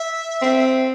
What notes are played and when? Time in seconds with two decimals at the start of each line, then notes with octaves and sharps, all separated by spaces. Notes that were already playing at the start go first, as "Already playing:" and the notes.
Already playing: E5
0.42 C4